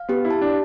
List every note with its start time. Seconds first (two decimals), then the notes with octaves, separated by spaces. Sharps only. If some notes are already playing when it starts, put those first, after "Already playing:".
Already playing: F5
0.09 B3 G4
0.25 E4
0.31 A5
0.42 D4